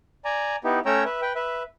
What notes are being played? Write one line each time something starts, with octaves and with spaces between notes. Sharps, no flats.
D5 G#5 A#5
B3 D#4 E4 G4
A3 C#4 C#5 G5 A#5 E6
B4 E5
B4 G5
B4 E5